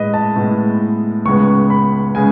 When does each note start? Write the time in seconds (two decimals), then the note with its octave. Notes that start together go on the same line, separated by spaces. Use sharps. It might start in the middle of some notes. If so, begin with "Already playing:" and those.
Already playing: A2 G#3 B4 D#5
0.14 A5
0.36 A2 G#3 B3
1.25 C#2 C#3 G#3 B3 C#6
1.70 B5
2.15 C#3 G#3 B3 G#5